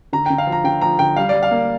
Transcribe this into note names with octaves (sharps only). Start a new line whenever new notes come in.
D3 A#5
G5
D3
F5
F3
A#5
D3 G5
F3 A#5
D3 G5
G3 F5
D5
G3
F5
A#3